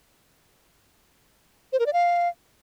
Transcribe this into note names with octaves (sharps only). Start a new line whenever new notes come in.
C5
A#4
D5
F5